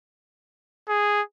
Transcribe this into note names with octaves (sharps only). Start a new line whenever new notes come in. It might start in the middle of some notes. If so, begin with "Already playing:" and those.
G#4